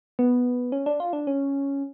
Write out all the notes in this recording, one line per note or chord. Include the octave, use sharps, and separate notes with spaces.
B3
C#4
D4
F4
D4
C#4